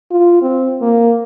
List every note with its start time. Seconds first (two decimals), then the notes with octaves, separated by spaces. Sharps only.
0.11 F4
0.42 C4
0.82 A#3